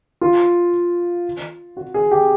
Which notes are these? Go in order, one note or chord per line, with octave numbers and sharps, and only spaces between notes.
F4
F#4
G#4
G4